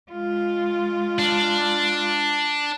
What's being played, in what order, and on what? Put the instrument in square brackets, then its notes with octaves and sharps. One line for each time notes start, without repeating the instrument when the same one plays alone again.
[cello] G#3 F4
[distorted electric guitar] D4